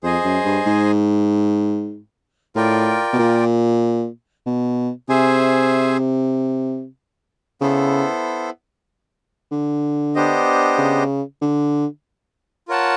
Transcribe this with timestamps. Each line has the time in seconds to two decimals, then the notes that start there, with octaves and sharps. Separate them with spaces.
0.03 F2 G#4 C5 D#5 G#5
0.24 F#2
0.45 G2
0.66 G#2
2.56 A2 F4 A#4 D5 G5
3.13 B2
3.19 A#2
4.46 B2
5.09 C3 G#4 C5 E5 G#5
7.61 C#3 B3 E4 A4 C5
9.52 D3
10.15 B3 D4 G4 C5 D#5
10.78 C#3
11.42 D3
12.68 F4 A#4 C#5 F#5 A5